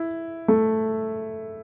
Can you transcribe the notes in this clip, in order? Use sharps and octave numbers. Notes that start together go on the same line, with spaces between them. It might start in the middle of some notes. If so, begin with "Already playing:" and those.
Already playing: E4
A3